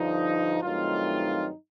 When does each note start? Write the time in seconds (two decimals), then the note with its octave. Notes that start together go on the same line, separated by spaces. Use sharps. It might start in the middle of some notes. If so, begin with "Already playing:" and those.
Already playing: G2 D3 F3 D#4
0.62 G2 D#3 F#3 A3 C4 D#4 F4